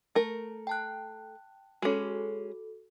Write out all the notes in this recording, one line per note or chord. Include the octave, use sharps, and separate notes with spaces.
A3 A#4
G5 A5 F#6
G#3 C#4 F#4 A4